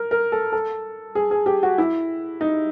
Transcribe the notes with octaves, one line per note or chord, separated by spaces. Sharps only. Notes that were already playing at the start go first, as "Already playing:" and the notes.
Already playing: A#4
A#4
A4
A4
G#4
G#4
G4
F#4
E4
D#4